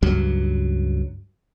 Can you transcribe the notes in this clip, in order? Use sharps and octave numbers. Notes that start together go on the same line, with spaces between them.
C#2 G2 F#3